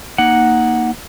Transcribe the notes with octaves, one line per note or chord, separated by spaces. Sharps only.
A#3 D#4 F#5